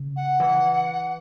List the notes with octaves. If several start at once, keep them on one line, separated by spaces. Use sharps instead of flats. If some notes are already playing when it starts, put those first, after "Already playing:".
Already playing: C#3
F#5
E3